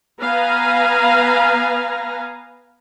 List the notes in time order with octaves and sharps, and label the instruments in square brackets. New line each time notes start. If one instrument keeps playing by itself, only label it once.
[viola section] B3 B4 F5 G#5 A#5